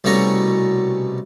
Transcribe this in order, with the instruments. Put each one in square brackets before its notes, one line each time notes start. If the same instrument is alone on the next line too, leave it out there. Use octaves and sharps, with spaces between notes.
[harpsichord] C2 B2 A3 C#4 A#5 C#6